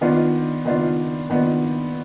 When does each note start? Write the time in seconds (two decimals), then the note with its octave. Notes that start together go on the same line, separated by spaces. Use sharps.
0.01 D#3 B3 D4 F4
0.65 D#3 B3 D4 F4
1.30 D#3 B3 D4 F4